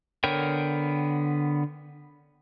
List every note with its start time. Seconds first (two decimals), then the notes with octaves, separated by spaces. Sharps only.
0.24 D3 B3 A#4 C#5 G5